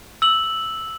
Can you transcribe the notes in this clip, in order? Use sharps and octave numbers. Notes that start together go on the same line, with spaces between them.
E6 F#7